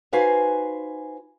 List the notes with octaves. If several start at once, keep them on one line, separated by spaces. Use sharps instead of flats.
D#4 F#4 B4 C5 F5 G#5